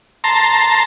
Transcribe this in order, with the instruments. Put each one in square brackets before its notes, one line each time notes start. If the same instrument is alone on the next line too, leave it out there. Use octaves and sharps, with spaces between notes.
[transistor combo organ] A5 A#5 C6